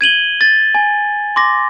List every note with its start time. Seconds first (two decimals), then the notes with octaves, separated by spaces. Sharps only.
0.01 G#6 D#7 F#7 G7
0.41 A6
0.75 G#5
1.36 C6 D6 A#6